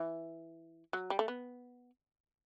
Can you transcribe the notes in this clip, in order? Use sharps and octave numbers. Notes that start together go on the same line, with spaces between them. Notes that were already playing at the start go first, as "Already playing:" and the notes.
Already playing: E3
F#3
G3
A3
B3